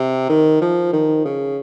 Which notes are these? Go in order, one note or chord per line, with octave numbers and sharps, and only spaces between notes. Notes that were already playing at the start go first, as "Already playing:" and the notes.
Already playing: C3
D#3
F3
D#3
C#3